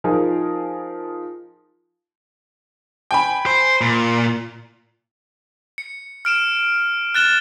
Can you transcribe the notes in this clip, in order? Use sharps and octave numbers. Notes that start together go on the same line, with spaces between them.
F3 D#4 G#4 A#4
G5 G#5 B5
C5
A#2
C#7
F6 D7 E7
F#6 A6 E7 G7